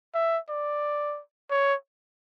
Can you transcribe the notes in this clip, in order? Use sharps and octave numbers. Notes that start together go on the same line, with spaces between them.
E5
D5
C#5